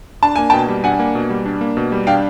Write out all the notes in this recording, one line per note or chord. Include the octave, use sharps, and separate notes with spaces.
D4 A5
A#3 G#5
B2 G5 A5
G3
D4 F#5 G#5
A#3
B2
G3
D4
A#3
B2
G3
D4 F5 G5